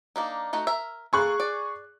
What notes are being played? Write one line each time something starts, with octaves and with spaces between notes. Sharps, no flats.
A#3 D4 D#4
A3 D#4 F#4
A#4 E5
A#3 G#4 A4 C#6 F#6
D5